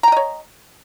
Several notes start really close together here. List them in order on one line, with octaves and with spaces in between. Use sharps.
A#5 G5 D#5 C#5